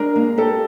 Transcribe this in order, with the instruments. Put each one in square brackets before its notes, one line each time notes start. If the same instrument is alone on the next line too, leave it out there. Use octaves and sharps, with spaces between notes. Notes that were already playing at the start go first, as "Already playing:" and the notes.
Already playing: [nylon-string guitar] G#3 D4 [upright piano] A#4
[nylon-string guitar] A#3
[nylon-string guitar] G4 [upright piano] A4